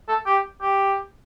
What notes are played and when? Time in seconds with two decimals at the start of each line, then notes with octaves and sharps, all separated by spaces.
0.09 A4
0.26 G4
0.62 G4